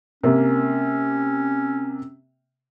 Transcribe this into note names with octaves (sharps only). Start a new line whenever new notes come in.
C3 A#3 C#4